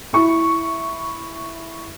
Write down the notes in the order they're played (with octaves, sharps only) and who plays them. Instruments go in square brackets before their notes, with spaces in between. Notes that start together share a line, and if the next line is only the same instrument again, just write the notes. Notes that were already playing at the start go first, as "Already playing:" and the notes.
[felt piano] E4 C#6